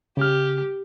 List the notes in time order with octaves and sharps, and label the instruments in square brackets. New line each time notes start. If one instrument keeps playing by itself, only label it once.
[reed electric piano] C#3 F6 [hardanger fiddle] G4